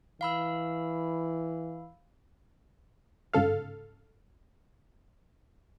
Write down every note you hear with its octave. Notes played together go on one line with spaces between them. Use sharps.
E3 F5 B5 E6
G1 G#2 C#3 A4 F5